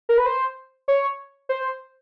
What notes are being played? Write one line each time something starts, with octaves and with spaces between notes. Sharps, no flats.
A#4
B4
C5
C#5
C5